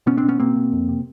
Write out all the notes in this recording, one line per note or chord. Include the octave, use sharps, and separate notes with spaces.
B2 B3 C#4
C4 D4
B2
B3 C#4
B2 A#3 C4
B2
F2
C3